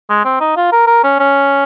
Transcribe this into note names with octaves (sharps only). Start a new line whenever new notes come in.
G#3
C4
D#4
F4
A#4
A#4
C#4
C#4